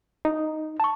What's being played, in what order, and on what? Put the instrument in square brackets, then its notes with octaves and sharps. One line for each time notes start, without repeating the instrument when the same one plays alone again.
[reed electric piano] D#4
[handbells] A5 C#6